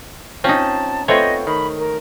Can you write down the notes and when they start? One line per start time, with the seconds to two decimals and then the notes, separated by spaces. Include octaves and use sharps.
0.44 C4 C#4 D#4 F4 A5
1.08 A3 B3 C4 F4 C5 C#5 D#5
1.47 D#3 B5
1.78 A#4